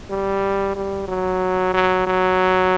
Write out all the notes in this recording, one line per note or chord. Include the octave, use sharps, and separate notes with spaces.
G3
G3
F#3
F#3
F#3